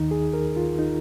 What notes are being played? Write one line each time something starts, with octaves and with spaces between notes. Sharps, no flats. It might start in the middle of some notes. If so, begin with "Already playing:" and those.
Already playing: D#2 D#3 D#4
G#4
A#4
F4
D#4